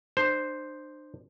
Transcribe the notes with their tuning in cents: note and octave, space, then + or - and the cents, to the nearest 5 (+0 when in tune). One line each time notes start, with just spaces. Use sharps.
D4 +40 C5 +0